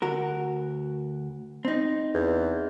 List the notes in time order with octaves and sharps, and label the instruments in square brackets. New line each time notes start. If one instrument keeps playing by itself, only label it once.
[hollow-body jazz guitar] D2 F#4 A#4
C4 D#4
[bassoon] E2